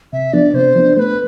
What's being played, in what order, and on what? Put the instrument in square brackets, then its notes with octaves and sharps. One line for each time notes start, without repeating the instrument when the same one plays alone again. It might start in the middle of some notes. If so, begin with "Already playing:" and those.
[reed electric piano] C3 [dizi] E5
[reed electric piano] F3 B3 D4 [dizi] D5
[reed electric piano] C3 [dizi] C5
[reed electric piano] F3 B3 D4
[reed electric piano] A3 [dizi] B4 C5